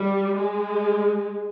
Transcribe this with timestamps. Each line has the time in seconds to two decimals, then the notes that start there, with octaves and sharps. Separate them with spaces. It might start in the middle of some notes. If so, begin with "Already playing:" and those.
Already playing: G3
0.37 G#3